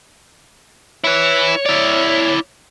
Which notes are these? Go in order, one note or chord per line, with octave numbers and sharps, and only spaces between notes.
E4 B4 C#5
E4 D5